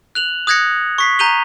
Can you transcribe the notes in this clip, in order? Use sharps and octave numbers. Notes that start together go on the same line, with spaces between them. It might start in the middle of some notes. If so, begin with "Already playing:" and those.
F#6 F7 F#7
D#6 F#6 G#6 A#6 C#7
C#6 B6 C7
A#5 G6 D#7 F7 G7